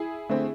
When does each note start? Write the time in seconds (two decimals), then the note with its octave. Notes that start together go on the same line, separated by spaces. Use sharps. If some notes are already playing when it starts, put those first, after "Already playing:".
Already playing: E4 G#4
0.29 D3 A3 C4